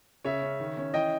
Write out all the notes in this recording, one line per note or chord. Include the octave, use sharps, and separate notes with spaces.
C#3 C#5 E5
C#4
D#3
C#4
E3 D#5 G5